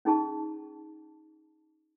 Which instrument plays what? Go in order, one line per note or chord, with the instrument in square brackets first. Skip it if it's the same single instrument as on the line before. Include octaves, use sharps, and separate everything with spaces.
[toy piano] C#4 D#4 G#4 A5 C#6